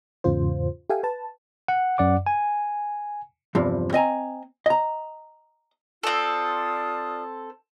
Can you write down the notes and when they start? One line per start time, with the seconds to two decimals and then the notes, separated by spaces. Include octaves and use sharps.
0.24 E2 G#2 C#3 F4 C5
0.90 G4 A4 E5 F5 G5 G#5
1.03 B4 A5
1.68 F#5
1.98 F#2 D5 F#5 D6
2.26 G#5
3.55 E2 G2 C3 F3
3.93 C4 D#5 G#5 A#5
4.66 D#5 A#5
6.03 C4 F4 A4 D5 D#6